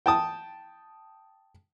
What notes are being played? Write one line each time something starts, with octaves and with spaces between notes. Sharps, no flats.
G5 A5 D#6